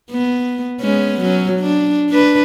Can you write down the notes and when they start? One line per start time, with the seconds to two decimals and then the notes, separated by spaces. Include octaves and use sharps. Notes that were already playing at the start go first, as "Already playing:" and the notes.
0.11 B3
0.81 G#3 B3 C#4
1.20 F#3 C#4
1.60 D4
2.10 D4 B4